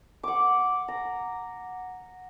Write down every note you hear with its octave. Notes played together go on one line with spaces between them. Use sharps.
F#5 D6
A#5